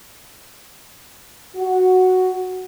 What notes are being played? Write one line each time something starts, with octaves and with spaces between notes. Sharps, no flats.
F#4